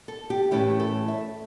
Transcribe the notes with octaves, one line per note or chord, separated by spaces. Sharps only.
A4
G4
A2 E3 A3 C#4 E4 G4
A4
E5